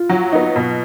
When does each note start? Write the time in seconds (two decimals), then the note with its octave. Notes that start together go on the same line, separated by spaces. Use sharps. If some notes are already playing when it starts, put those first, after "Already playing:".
Already playing: F4
0.09 F#3
0.32 B3 D#4
0.56 B2